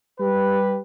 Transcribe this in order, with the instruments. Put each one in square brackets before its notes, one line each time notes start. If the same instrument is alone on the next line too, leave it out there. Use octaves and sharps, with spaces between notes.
[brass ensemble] G3 G4 B4